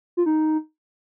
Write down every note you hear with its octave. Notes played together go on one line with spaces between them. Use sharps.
F4
D#4